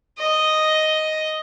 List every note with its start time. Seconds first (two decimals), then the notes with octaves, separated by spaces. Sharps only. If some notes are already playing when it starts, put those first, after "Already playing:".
0.18 D#5